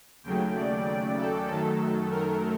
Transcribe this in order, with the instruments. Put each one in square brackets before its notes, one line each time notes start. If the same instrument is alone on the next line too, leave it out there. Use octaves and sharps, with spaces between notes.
[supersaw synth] D#2 C#3 F#3 A3 G5
D5
D5
A4
F#2 D#3 F#3 A3 A4
A#4